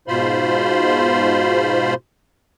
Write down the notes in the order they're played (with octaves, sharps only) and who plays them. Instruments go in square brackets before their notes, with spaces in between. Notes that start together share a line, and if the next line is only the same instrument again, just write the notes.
[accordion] G#2 B2 F4 C5 B5 C6